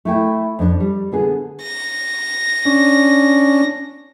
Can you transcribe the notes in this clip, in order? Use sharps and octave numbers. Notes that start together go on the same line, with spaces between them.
A3 E4 G5
F2 D4
G3
D3 B3 G#4
A#6
C#4 D4